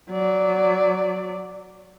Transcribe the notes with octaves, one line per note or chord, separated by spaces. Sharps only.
F#3 D5